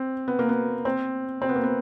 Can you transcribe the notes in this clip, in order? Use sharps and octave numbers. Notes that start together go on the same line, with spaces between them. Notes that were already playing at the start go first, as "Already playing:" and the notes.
Already playing: C4
B3
A#3
B3
C4
C4
B3
A#3
B3